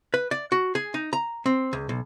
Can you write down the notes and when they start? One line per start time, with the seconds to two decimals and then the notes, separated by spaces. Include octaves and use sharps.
0.14 B4
0.31 D5
0.52 F#4
0.75 G#4
0.94 D#4
1.13 A#5
1.46 C4
1.73 C#2
1.89 B1